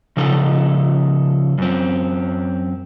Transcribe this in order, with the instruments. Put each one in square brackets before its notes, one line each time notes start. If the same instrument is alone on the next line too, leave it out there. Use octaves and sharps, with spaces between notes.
[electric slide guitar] C#3 F3 D#4 A4
F#2 C4